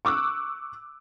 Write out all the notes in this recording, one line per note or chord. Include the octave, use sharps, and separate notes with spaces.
C#6 D6 E6 F#6